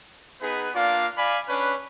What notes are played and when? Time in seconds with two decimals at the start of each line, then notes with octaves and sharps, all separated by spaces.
0.41 B3 D#4 G#4 B4
0.74 A#3 D4 F4 D5 F5
1.17 D5 F5 G#5 B5
1.48 C#4 D4 B4